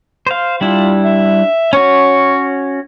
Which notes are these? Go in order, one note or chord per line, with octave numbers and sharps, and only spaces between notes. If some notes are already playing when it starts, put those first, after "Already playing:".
C5 F5
G3 D4 E4 F4
E5
C#4 F#4 C#5